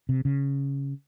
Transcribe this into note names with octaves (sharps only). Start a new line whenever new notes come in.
C3
C#3